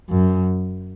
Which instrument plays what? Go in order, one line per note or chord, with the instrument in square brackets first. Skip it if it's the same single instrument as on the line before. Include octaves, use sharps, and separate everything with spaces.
[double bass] F#2